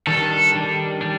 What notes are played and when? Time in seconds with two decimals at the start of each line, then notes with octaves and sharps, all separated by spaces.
0.07 D#3 G3 D4 A4
0.55 D#3 G3 D4
1.01 G3 D4